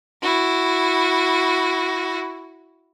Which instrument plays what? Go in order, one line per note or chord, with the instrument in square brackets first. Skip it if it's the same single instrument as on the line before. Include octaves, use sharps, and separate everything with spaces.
[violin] E4 F#4